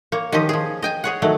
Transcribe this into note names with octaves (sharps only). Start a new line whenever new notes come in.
A#3 C#5
D#3 F3 C#4 G4 D#5
F3 G#4
D#5 G5 G#5
G#4 C#5 F#5
D#3 F#3 A3